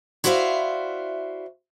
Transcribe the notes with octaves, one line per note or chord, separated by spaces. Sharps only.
E4 F#4 C5 D5 E5 F5